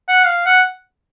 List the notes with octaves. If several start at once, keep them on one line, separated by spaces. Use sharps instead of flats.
F#5
F5
F#5